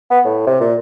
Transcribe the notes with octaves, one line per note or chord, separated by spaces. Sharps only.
B3
A2
C3
A#2